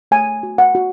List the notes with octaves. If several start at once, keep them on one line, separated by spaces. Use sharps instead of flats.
A3 G#5
F#4
F#5
F#4